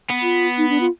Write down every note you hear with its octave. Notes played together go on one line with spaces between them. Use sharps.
B3
F4
D#4
D4
F4